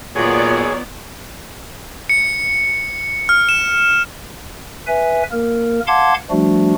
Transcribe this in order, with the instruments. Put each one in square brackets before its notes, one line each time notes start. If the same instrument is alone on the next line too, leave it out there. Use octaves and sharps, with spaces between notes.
[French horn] A#2 [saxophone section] D#3 F#3 [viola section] B3 F4 D5 [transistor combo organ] G#4
[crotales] C#7
F6
E7
[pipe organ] B4 E5 G#5
A#3 A#4
F5 F#5 A5 C6 D6 G#6
F3 G3 A3 D4 F#4